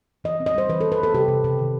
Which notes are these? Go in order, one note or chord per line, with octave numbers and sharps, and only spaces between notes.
E3 D#5
C4
D#5
G3 C5
E3 B4
E3 A4
B4
E3 A4
C3 G4
C3
C3
D#3